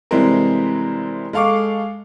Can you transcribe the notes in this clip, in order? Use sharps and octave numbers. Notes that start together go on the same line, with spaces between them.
C3 E3 G3 G#3 C4 A#4
G#3 A4 F5 C#6 D6